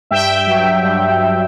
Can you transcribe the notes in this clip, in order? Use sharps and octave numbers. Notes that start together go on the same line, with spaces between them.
G2 E5 G5
F#3
G2
G2